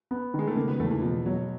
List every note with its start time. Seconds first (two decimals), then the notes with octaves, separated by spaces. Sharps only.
0.11 B3
0.34 D#3 G#3
0.47 A3
0.56 C#3 A#3
0.68 B3
0.80 E2 A3
0.91 E3
1.02 B2 F3
1.25 B2 F#3